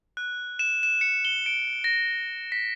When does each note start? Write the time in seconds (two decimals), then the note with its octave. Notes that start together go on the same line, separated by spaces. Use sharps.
0.17 F#6
0.59 E7
0.83 E7
1.01 C#7
1.25 G7
1.46 D7
1.84 A#6
2.52 B6